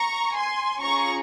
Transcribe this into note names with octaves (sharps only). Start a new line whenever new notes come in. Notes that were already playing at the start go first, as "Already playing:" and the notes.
Already playing: A#5 C#6
G#5 C6
C#4 F4 G#4 A#5 C#6